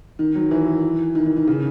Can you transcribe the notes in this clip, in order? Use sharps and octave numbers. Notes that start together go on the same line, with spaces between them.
D#3
F#3
E3
D#3
D#3
D#3
C#3